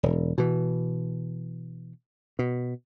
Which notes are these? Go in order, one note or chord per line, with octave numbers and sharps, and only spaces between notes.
E1
B2 E3
B2